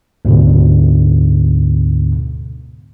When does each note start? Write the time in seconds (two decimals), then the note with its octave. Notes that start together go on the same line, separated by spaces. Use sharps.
0.25 D2 G#2 B2 D3